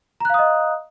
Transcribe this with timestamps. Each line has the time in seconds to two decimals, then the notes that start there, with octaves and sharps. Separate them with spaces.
0.20 A#5
0.25 F#6
0.30 F5
0.34 D#6
0.39 D#5